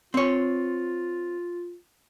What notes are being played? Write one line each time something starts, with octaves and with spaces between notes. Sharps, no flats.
C4 F4 C#5